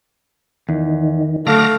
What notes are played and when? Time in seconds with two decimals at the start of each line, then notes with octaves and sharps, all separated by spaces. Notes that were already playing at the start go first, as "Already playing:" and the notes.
0.69 E2 D#3
1.47 D3 F#3 A3 D4 F5 D6 F6 A#6